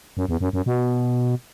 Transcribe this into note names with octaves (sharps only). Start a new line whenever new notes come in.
F#2
E2
F#2
F#2
B2